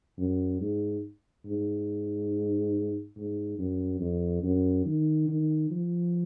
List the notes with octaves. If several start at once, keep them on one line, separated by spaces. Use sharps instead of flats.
F#2
G#2
G#2
G#2
F#2
F2
F#2
D#3
D#3
F3